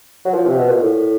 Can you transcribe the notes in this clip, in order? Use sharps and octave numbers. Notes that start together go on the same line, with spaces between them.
F#3
F3
C3
B2
A#2
A2